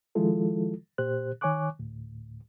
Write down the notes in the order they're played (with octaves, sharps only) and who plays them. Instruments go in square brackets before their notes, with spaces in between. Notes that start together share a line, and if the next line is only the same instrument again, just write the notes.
[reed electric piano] D#3 F3 G#3 E4 F4 A4
A#2 G4 C5 F#6
D#3 C#5 G#5 C#6 D6 F#6
D2 A2